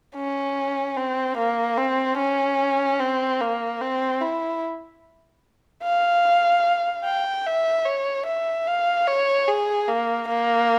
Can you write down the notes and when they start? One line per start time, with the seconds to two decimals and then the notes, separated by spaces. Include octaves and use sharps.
0.16 C#4
0.97 C4
1.38 A#3
1.78 C4
2.18 C#4
2.99 C4
3.41 A#3
3.81 C4
4.21 E4
5.84 F5
7.04 G5
7.46 E5
7.86 C#5
8.27 E5
8.67 F5
9.08 C#5
9.48 G#4
9.88 A#3
10.29 A#3